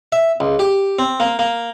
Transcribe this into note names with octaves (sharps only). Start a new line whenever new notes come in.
E5
C#2
G4
C4
A#3
A#3